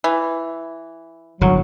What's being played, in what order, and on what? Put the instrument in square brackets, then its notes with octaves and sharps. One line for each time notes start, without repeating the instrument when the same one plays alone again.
[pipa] E3
[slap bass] G1 A2 [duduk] F#3